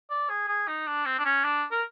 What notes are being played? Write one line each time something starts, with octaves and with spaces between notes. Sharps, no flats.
D5
G#4
G#4
D#4
D4
C4
D4
C#4
D4
A#4